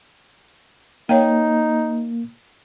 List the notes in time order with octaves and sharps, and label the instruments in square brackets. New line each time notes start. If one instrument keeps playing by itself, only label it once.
[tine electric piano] A#3 [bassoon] D#4 [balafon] C#5 F5 G5